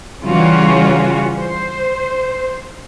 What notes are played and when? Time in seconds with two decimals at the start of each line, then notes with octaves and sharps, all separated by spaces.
0.24 C#3 E3 G3 C#4 F4 F#4
1.39 C5